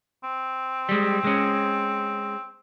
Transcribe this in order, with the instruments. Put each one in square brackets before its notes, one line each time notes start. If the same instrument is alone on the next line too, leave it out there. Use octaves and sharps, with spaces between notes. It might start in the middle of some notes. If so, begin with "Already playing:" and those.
[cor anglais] C4
[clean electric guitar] G3 G#3
G#3 C#4